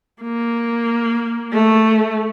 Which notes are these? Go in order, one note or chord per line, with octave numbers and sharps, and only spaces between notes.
A#3
A3